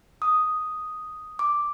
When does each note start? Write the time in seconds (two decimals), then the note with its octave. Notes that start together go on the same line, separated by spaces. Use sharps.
0.22 D#6
1.39 D6